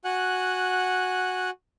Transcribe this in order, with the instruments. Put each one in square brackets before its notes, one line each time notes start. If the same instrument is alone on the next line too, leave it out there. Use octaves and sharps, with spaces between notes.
[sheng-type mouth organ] F#4 F#5 G#5 F#6